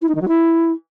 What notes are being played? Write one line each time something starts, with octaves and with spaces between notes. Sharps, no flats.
E4
D#4
D#3
F#3
E4